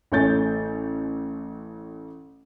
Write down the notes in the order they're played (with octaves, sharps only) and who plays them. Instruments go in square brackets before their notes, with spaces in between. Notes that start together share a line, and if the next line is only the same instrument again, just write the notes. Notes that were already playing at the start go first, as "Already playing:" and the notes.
[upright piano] A1 A3 C#5 G#5 G6 A6